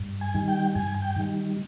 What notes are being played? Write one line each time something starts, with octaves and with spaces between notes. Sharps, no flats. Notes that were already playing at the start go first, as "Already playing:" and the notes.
Already playing: G2
G#5
D#3 G3
G5
G2 G#5
G5
D#3 G3